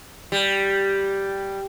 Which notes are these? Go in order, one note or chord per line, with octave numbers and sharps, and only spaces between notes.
G3